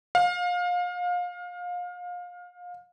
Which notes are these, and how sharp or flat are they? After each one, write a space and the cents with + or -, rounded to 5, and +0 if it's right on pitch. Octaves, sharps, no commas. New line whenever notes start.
F5 +30